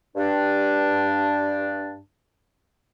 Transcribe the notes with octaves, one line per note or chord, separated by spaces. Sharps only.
G2 D4